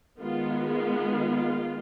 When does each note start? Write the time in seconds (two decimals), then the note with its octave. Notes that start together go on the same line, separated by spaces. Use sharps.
0.21 D#3 G#3 B3 F4
0.72 F4